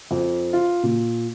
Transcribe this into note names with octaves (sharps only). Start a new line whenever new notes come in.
F2
F4
A#2